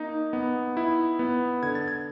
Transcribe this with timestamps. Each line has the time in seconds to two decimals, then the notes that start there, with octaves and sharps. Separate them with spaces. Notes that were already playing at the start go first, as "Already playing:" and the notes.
Already playing: A#3 D#4
0.33 B3
0.77 E4
1.19 B3
1.63 D3 G#6
1.75 A6
1.88 G#6